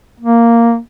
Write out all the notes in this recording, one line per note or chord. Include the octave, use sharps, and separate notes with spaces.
A#3